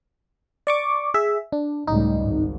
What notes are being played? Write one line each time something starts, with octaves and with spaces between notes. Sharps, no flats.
D5 C#6 D6
G#4 E5
D4
C#2 A2 G3 D#4
G#1 G#2